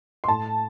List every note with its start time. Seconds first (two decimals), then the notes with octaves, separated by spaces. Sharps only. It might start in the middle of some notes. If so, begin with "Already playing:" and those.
0.24 C6
0.28 A2 A5